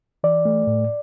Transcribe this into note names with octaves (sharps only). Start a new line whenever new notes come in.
E3 D5
A3
A2